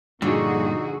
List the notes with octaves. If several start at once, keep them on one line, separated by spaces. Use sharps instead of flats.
G2 A#2 D3 F3 D#4 F#4 G#4